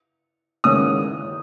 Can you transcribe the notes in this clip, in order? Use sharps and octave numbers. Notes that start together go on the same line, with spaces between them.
D#3 G#3 C#4 G#4 C#5 D#6